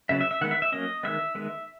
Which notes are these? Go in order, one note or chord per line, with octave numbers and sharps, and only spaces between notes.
C#3 F#3 B3 E5
E5
E5
D#3 G#3 B3 F#5
E5
E5
F#3 A#3 C#4 D#5
D#3 G#3 B3 E5
D#3 G#3 B3